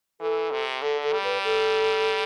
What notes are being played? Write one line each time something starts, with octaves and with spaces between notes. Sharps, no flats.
E3 A4
C3
D3 A4
A4
G3
B4
A4